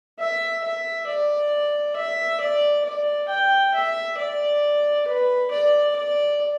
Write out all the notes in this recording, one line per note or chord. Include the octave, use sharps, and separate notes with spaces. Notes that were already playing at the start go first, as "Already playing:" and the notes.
E5
E5
D5
E5
D5
D5
G5
E5
D5
B4
D5
D5